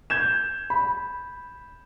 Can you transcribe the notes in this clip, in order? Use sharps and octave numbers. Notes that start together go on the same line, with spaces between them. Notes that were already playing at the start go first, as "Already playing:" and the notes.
G6 G#6 E7
B5